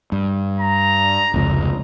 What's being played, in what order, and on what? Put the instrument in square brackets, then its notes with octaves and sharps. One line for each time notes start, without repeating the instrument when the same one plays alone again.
[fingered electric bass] G2
[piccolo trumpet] A#5
[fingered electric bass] F1 C#2